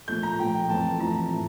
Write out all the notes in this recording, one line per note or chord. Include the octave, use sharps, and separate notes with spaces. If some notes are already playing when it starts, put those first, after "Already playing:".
A#2 F3 A3 G6
A#5
A#2 F3 A3 G5
G5
F2 E3 A3 A5
F2 E3 A3 A#5
A2